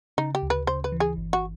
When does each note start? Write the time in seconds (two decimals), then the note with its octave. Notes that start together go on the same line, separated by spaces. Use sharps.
0.18 C#3 D#4
0.35 G4
0.43 D2
0.50 B4
0.67 C#3 C5
0.84 B4
0.92 E3
1.00 G#4
1.16 G1
1.33 F#4